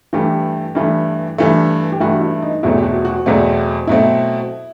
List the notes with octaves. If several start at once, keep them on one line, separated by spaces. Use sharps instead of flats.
G2 E3 A3 G4
G2 E3 A3
G2 E3 A3
G4
G2 E3 A3 F#4
E4
D#4
E2 B2 F#3 A3 C4 E4
G4
F#4
F#4
E2 B2 F#3 A3 C4
B2 F#3 A3 C4 E4